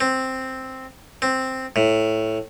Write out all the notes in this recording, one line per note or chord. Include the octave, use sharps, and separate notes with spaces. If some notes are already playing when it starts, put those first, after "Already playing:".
C4
C4
A2